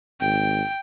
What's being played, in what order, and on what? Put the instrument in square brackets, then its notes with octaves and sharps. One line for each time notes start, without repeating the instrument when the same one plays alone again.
[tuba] G#1 [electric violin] G5